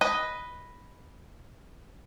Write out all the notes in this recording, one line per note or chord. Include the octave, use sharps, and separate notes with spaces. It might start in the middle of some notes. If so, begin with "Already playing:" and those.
B4 D#5